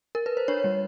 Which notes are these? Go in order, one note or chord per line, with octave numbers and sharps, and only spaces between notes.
A#4
B4
C5
D4 C#5
G3